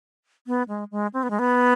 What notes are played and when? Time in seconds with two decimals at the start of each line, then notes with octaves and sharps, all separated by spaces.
0.47 B3
0.68 G#3
0.91 G#3
1.13 C4
1.23 B3
1.30 G#3
1.39 B3